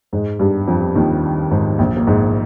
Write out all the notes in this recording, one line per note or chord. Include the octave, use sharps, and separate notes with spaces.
G#2 G#3
G2 G3
F2 F3
D#2 D#3
G#2
A#1 A#2
A#3
G#2 G#3